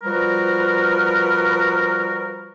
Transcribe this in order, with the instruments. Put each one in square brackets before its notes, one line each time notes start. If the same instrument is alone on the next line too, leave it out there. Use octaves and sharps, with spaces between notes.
[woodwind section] F3 G3 F#4 A#4 B4